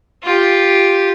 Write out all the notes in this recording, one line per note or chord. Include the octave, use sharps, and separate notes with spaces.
F4 G4